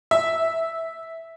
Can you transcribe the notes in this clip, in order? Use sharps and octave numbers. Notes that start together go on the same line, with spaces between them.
E5